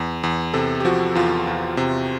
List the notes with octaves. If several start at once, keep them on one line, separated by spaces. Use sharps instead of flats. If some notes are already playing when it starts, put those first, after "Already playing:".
Already playing: E2
E2
C3 A4
G4
F3 F#4
E2 F4
E2
C3